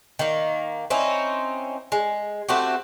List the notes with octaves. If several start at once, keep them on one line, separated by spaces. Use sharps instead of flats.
D#3 A#3
C4 C#4 D#4 E4
G#3
A3 C4 F#4 G4